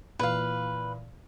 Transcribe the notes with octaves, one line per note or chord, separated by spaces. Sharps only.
A#2 E3 B4 F5